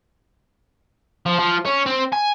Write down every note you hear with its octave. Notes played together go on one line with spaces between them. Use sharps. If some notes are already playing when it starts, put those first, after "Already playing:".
F3
F3
C#4
C4
G#5